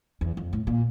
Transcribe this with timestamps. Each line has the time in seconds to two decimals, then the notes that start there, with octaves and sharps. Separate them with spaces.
0.21 E2
0.37 F2
0.53 A2
0.67 A#2